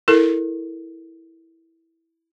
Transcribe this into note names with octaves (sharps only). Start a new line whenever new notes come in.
E4 A4 A#4